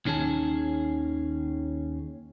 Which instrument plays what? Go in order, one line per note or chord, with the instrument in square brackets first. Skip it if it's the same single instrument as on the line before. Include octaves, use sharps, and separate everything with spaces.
[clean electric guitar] D#2 D#3 C#4 G#4 A5